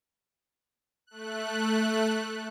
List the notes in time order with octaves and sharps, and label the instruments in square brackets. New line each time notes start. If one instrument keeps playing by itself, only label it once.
[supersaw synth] A3 F#6